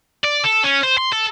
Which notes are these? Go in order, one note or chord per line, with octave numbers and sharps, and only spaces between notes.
D5
A4
C#4
C5
C6
A4